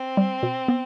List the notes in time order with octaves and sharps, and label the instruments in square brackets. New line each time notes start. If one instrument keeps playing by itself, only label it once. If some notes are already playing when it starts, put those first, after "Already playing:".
Already playing: [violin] C4
[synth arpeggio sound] G3
B2
B3